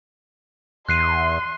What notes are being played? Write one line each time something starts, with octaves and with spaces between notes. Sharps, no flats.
E2 C6 F#6 C7 D#7